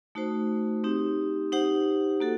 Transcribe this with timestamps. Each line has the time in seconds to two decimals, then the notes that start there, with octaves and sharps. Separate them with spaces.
0.15 A3 D#4 F#4 C5
0.84 C4 D#4 G4
1.52 D#4 G4 C5 F#5
2.20 A#3 F#4 A4